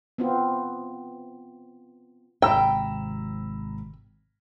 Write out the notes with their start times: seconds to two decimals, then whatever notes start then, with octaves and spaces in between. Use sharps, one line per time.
0.18 B3 C4 F4
2.42 G#1 C3 G5 A#5 B5 E6